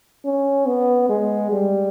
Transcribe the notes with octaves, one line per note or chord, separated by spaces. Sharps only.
C#4
B3
G#3
G3